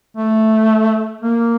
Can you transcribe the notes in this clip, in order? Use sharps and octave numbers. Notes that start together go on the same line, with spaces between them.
A3
A#3